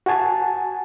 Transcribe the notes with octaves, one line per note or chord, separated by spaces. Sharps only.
F#4 F#5 G#5 A5